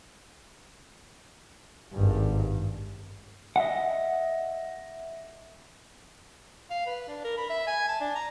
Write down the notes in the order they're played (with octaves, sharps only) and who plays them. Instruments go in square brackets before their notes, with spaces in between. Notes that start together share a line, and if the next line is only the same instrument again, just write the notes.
[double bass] G#1 G2
[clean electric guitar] D#5 E5 F#5
[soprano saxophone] F5
B4
D4
A#4
B5
E5
G#5
A5
D4
A#5